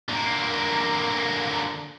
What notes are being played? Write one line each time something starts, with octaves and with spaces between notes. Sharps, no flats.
D3 A#3